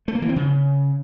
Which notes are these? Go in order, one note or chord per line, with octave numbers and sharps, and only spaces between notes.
A3
A#3
E3
C4
C#3